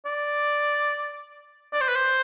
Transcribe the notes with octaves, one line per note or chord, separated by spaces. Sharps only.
D5
D5
C5
B4
C5